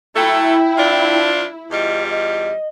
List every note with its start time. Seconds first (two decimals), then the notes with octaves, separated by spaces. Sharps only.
0.16 F#3 A3 E4 A4 G5
0.78 F3 D4 F4
1.71 E2 G3 F4 D#5
2.10 D#5